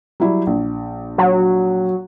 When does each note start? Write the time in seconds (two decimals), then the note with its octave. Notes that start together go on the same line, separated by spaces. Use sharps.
0.20 F#3 G3 E4
0.47 A#1
1.18 F#3